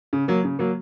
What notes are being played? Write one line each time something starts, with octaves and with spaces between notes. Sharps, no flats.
C#3
F#3 A#3
C#3
F#3 A#3